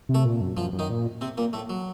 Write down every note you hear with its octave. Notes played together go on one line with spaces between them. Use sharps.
C3
A3 A4
A#2
F#2
F#2 F3 F4
F#2
D#3 D#4
A#2
C3 C4
A#2 A#3
A2 A3
F#3